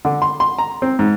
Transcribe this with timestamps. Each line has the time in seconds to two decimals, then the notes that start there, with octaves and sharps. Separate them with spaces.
0.05 D3
0.22 C6
0.40 C6
0.58 A#5
0.82 C4
0.99 G#2